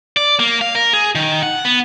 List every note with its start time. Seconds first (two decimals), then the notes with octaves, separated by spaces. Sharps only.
0.17 D5
0.39 A#3
0.61 F5
0.75 A#4
0.93 G#4
1.15 D#3
1.43 F#5
1.65 B3